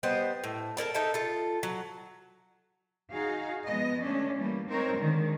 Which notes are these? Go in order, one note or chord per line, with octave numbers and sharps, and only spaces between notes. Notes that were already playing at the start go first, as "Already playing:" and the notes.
G3 B3 C5 D#5
A2
A4 A#4 D5 A5
D#4 A4 E5
F4 A4
F#3
D#4 F#4 G#4 F5
F3 G#3 B3 D#5
D3 A3 C#4 D4
E3 G3 A3 A#3
C4 D#4 A#4 C5 C#5
D3 D#3 G#3